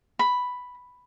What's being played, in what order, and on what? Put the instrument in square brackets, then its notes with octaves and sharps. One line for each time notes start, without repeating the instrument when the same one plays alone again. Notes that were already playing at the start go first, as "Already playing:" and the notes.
[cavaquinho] B5